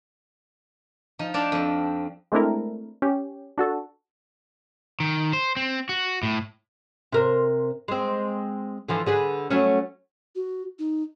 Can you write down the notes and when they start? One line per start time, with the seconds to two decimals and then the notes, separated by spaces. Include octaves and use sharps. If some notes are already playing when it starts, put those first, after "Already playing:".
1.19 F3 D#4
1.34 D4 C5 D5 F5 G5 A5
1.52 F2 C4
2.32 G#3 A3 C4 D4 E4 A#4
3.02 C#4 G4
3.58 D4 F#4 A4
5.00 D#3
5.33 C5
5.57 C4
5.89 F#4
6.23 A2
7.12 C3 A#4 C5
7.88 G#3 C4
8.88 D3 E3 F3
9.06 D3 G#4 B4
9.50 F#3 A3 C#4
10.35 F#4
10.79 D#4